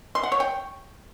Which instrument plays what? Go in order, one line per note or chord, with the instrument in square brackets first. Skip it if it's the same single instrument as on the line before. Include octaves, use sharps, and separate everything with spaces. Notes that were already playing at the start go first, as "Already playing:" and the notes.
[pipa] C6
F#5
C#5
G5